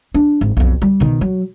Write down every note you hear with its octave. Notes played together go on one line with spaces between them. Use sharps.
D4
G#1
B1 F2
G3
B2 D#3
F#3